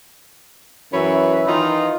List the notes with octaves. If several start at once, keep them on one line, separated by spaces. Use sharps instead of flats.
F#2 E3 B4 C#5 E5
D#3 E3 D#4 F4